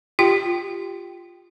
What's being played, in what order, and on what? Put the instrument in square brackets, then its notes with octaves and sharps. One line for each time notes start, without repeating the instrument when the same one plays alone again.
[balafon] F4 G4 G5